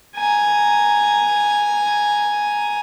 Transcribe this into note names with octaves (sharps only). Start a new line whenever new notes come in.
G#5 A#5